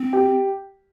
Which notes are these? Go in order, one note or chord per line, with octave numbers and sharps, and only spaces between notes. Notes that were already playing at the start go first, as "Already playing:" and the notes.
Already playing: C4
G4